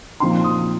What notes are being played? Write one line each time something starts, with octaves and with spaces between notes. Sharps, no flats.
A#2 F3 C4 D#4 C6
D#6